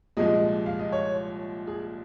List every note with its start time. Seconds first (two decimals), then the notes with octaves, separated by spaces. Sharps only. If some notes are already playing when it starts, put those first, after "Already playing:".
0.17 C2 A#2 F3 G#3 D#5
0.66 F5
0.79 D#5
0.92 C#5
1.67 G#4